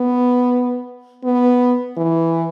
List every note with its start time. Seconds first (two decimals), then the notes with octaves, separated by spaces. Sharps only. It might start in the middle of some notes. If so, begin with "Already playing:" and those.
Already playing: B3
1.24 B3
1.97 E3